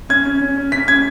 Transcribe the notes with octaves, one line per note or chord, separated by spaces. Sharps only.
C#4 G#6
C#4
C#4
C#4
C#4 B6
C#4 G#6